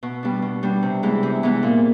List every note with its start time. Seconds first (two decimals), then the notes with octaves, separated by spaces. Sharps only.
0.03 B2
0.23 G3 B3 D4
0.42 B2
0.63 G3 B3 D4
0.83 C3
1.03 E3 G#3 B3
1.23 C3
1.43 E3 G#3 B3
1.63 A#2